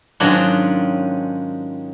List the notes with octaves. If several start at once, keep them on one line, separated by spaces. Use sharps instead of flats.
G#2 D#3 F#3 C#4 D4 F4